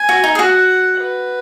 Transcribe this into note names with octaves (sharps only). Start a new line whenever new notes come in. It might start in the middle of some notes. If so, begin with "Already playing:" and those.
Already playing: G#5
F#4
D#4
G#4
F#4 F#5
B4